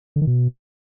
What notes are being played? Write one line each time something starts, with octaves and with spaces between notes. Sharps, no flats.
D3
D#3
B2